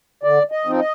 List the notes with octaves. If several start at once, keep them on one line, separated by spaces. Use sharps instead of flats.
D3 D5
D#5
F3 C4 D#4
D#5